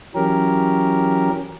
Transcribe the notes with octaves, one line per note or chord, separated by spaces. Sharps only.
E3 F#3 C#4 G4 A#4